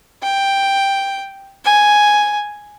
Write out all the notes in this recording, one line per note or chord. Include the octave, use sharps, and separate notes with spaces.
G5
G#5